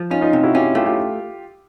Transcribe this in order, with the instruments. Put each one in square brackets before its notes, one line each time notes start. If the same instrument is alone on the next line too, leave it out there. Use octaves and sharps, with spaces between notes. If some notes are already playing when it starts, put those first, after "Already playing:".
Already playing: [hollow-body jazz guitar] F3
[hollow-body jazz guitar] C#4 [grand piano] D#4 F4
[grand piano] D#4 F4
[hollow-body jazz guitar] C3
[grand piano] E4 F#4
[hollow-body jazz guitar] C#4 [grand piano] F4 G4
[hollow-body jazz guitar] A3 [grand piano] F4 G4
[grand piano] F4 G4